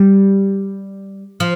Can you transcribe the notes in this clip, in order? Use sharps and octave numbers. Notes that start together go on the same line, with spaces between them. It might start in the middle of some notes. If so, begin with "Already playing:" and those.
Already playing: G3
F3